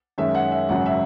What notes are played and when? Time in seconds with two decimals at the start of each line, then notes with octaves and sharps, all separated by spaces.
0.18 F#2 D#3 G#3 C#4 E5
0.35 F#5
0.51 E5
0.69 G#1 F#2 C#3 F#3 F#5
0.86 E5